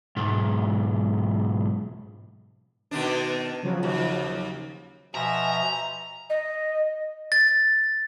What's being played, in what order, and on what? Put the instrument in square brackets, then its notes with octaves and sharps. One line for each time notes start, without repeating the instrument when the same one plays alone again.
[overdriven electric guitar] B1 G#2
[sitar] B2 D#3 D4
[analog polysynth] C#3 F3 F#3
[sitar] D#2
[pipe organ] B2 F3 [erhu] E5 [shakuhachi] G#5 [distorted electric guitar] A#5
[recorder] D#5
[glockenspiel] A6